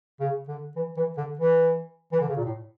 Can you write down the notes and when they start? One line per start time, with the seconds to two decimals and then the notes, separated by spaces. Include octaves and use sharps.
0.20 C#3
0.48 D3
0.76 E3
0.97 E3
1.17 D3
1.39 E3
2.12 E3
2.20 D3
2.29 C#3
2.36 A#2
2.44 A2